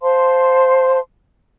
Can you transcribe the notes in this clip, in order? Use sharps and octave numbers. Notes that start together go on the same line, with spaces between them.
C5 F5 A5 C6